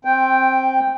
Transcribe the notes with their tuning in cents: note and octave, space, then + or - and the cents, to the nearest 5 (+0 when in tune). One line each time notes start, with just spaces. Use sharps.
C4 +15 G5 +0